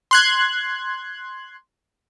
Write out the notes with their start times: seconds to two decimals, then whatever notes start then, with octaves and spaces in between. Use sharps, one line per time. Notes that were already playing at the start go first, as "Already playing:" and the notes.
0.11 C6 F#6 G#6